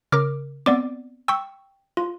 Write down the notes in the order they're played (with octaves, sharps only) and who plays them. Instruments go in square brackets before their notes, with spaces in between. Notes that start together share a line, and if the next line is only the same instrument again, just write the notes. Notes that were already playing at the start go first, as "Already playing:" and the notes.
[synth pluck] C#3 A#4 [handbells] D6 F6
[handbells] B3 D5 D6 [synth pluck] C4
[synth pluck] G5 [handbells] C#6 E6
[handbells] F4